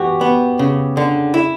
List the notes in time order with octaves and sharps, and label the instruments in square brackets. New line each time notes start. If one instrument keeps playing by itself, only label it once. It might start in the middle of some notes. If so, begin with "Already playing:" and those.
Already playing: [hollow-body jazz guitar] E3 F#4 [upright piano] G4
[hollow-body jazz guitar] B3
C#3
D3
E4